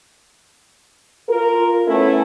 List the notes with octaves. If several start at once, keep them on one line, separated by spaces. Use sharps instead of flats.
F4 A#4
A3 B3 C#4 E4 A4